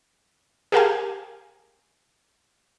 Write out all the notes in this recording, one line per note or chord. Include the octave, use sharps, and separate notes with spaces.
G4 G#4 A#4 F5 G5 G#5